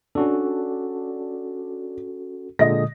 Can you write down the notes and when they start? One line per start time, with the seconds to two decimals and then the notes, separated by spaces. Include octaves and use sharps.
0.15 C#4 D4 F#4 A4
2.59 A#2 D3 G#3 D#5 A#6